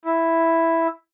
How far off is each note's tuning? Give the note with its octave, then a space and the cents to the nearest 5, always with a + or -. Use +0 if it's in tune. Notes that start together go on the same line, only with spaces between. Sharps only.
E4 +0